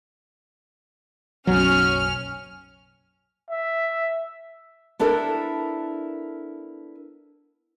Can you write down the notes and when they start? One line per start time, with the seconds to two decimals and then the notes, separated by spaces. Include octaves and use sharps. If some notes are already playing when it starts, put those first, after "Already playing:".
1.47 F#1 B1 F#3 C#4 F6
3.50 E5
4.99 B3 D4 E4 A4 A#4